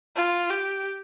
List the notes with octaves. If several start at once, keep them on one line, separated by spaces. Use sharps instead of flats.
F4
G4